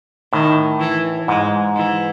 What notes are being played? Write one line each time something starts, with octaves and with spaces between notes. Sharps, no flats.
A2 D#3
E3
G#2 G#3
E3